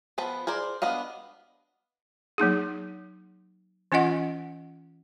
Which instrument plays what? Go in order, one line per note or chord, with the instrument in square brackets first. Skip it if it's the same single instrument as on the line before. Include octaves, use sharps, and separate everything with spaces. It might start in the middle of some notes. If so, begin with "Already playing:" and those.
[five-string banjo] F3 B3 B4 A5
G#4 A#4 C5 D5
B3 D4 D#5 F5
[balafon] F#3 A#3 D#4 G#4
E3 C#4 F4 D#5 F#5